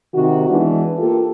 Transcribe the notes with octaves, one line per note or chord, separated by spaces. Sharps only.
C3 D#3 F#4
E3 G#3 B3 D4
A#3 F4 G4 A4